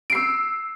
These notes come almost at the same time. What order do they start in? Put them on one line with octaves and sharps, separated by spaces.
D7 C7 E6